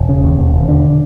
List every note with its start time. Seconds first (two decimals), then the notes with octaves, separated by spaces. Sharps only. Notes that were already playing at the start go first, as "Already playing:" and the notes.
Already playing: E1
0.09 C#3
0.24 D#2
0.39 E1
0.54 E1
0.68 D3